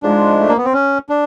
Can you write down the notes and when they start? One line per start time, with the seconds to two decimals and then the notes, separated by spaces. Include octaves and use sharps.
0.03 G#2 F3 G#3 D4
0.40 A3
0.48 A#3
0.57 B3
0.65 C4
0.73 C#4
1.09 D4